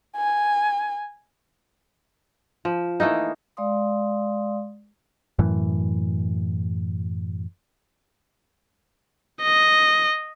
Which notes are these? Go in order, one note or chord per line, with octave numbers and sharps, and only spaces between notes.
G#5
F3
E3 A3 A#3 D#4
G#3 D5 F5 C6 D#6
F#2 A2 E3
D#5